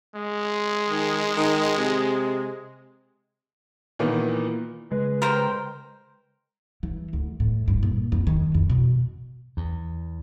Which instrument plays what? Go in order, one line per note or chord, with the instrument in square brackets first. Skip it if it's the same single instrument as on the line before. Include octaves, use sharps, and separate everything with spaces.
[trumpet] G#3
[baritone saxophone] D#3
D#3
C3
[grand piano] A#2 D#3 E3 A#3 B3
[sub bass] C#3 [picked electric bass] G#3 [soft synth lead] B4
[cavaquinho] A#4 C5 G5
[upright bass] E3
D2
A2
G2
A#2
F2
D#3
F2
B2
[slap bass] E2